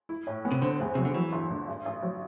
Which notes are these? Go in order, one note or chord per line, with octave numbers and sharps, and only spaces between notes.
E4
A2
B3
C3
D3 C4
E2
C3 F#3
D3
E3 F#3
G1
D3
A1
A1
F#3